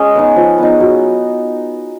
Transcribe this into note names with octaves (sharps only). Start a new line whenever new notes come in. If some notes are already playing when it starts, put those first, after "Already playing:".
Already playing: G#3 C#4 D#5
B3 D#4
F3
B3 D#4
F#3